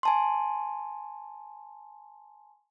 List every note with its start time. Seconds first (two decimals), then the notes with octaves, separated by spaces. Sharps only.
0.03 G#5 A5 C6